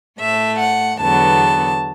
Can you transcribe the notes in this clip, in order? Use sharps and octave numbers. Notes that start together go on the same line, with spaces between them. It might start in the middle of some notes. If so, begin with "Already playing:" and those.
A2 A3 E5
F#5
E2 D3 F#3 B3 A5